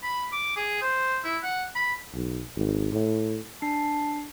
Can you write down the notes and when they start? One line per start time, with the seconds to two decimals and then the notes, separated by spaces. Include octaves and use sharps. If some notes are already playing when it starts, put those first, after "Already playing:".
0.03 B5
0.32 D6
0.56 G#4
0.82 C5
1.24 E4
1.43 F#5
1.76 B5
2.14 B1
2.56 G#1
2.92 A2
3.62 D4 A5 C7